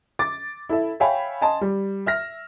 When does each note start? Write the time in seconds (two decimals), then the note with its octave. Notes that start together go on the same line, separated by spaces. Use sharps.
0.19 D6 A6
0.69 E4 A4 E5
1.00 C#5 E5 F5 G5 G#5 B5
1.42 D#5 G#5 A5 C6
1.61 G3
2.06 E5 F6 A#6